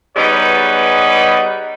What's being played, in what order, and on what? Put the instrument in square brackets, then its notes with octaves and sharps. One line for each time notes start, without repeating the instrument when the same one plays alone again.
[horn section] G3 B3 D#4 G#4 B4 C#5